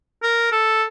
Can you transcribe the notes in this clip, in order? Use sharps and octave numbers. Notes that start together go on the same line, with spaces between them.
A#4
A4